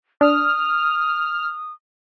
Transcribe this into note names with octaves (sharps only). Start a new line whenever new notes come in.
D4 D#6 F6